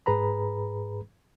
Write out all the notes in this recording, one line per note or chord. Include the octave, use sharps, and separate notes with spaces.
G#2 G#4 B4 A#5 B5